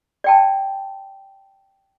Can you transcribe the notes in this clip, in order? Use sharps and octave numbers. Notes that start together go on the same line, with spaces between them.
D5 G5 A5